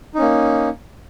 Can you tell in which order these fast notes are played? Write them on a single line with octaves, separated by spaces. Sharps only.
D#4 C#4 A#3